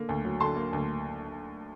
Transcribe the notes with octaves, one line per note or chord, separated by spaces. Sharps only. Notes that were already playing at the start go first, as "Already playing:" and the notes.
Already playing: D3 A#3
D2
F#3
D3 A5 C6
A#3
D2